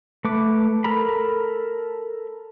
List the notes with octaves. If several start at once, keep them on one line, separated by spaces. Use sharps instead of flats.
A3 B4 D6
A4 A#4 A#5 B5